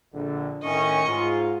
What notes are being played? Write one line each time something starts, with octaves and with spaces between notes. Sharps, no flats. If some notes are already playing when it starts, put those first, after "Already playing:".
A#1 D3
A2 D#3 C#4 D#5 C#6
G#2 F4